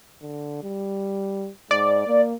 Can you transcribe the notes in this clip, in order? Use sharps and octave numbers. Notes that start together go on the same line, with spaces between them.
D3
G3
G#2 D5
A#3